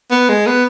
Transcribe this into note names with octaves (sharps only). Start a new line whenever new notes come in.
B3
G#3
B3